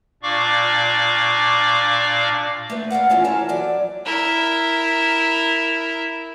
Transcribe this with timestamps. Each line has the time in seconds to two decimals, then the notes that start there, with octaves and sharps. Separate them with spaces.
0.23 A#2 D4 D5 F5 C#6 D6
2.70 A3 B4
2.91 A#4 D5 F5 F#5
3.10 E3 B3 C#4 F4 A4
3.24 E3 A4 A#4 C#5 A5
3.49 F2 F#3 D5
4.05 E4 A#4